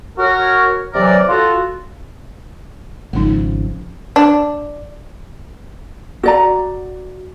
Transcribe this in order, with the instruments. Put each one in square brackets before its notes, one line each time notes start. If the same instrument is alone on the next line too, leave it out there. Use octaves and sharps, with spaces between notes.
[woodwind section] F#4 A#4 C#5
C3 E3 F#3 A#4 D5
F4 F#4 A4
[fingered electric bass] G#1 C#3 F3 [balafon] G#3 D#4
[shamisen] D4
[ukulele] F#4 D5 A#5